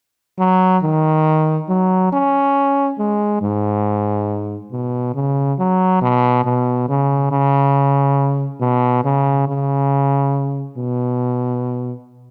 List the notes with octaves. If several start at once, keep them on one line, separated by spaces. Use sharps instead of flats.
F#3
D#3
F#3
C#4
G#3
G#2
B2
C#3
F#3
B2
B2
C#3
C#3
B2
C#3
C#3
B2